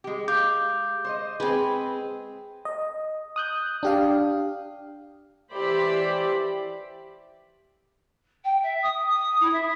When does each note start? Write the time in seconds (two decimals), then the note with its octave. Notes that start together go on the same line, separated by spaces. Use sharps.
0.04 G#3 G4
0.28 F5 D6 G6
1.05 C5 C#5 D#5
1.40 G#3 C4 G#4 B4
2.65 D#5
3.36 D#6 F#6 G6
3.83 D4 G4 F5
5.54 E3 G4 C5 D5 E5 B5
8.44 G5
8.63 E5
8.82 D#6
9.09 D#6
9.40 E4
9.52 E5